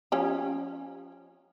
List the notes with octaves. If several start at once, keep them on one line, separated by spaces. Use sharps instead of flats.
F3 C#4 G4